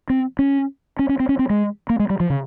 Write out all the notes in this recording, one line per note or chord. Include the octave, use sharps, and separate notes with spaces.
C4
C#4
C#4
C#4
C4
C#4
C4
G#3
A#3
G#3
G3
F3
C#3